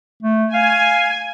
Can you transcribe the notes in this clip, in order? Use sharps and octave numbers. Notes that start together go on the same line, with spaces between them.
A3
F5 G#5